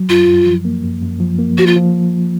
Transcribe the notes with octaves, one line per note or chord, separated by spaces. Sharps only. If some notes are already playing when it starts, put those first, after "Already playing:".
Already playing: F#3
F#2 F4
F#2
F3
A#3
F#2
F#2
F3
A#3
F3 F#4
F4
F3